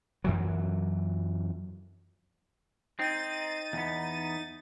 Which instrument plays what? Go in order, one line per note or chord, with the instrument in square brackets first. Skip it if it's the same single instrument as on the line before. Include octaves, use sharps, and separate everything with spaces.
[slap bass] F#2 E3 F#3
[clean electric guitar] C4 [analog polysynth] D#4 A6 D#7
[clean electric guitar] E2 B3